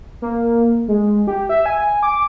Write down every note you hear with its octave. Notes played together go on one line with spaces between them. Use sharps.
A#3
G#3
G4
E5
G#5
D6